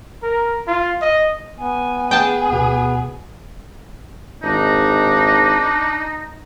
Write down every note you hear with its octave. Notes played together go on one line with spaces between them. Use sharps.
A#4
F4
D#5
B3 G#5
G#4 G5 A5
D2 B2 B3
G#1 D4 D#4